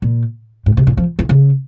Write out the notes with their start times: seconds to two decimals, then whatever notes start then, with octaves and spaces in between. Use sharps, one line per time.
0.02 A#2
0.66 G#2
0.77 C3
0.87 A#2
0.97 F3
1.19 E3
1.29 C#3